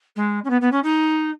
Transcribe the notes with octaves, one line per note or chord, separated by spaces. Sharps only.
G#3
C#4
B3
B3
C#4
D#4